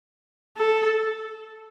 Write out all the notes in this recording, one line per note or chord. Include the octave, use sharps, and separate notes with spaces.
A4